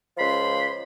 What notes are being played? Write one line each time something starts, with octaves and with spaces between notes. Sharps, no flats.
C#2 F3 B5 C6